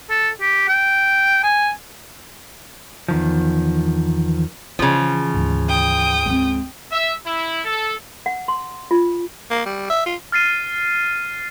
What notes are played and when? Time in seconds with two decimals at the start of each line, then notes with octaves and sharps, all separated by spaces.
0.10 A4
0.41 G4
0.68 G5
1.44 G#5
3.08 E2 D#3 F3
4.79 C#3 E3 F3
5.34 D2 G#2
5.68 G5 D#6
6.26 G#3 C4
6.92 E5
7.25 E4
7.65 A4
8.26 F#5
8.48 C6
8.91 F4
9.51 A#3
9.66 G3
9.90 E5
10.06 F4
10.32 F6 A6 C7 D#7